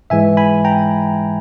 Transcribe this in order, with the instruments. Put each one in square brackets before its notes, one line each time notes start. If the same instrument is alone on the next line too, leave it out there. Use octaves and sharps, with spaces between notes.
[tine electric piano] G#2 E3 G#3 E5 G#5
G#5 B5
G5 A#5